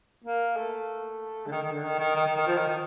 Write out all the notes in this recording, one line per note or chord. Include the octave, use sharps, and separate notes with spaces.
A#3
A3
D3
D#3
D#3
D3
D#3
D#3
D#3
D#3
D#3
F3
D#3
D#3